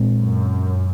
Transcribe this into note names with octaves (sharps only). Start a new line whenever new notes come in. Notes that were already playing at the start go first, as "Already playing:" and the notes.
Already playing: A#2 G#3 C4
F#2